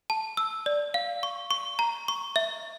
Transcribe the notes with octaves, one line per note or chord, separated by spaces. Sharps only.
A5
E6
D5
F5
C#6
C#6
A#5
C#6
E5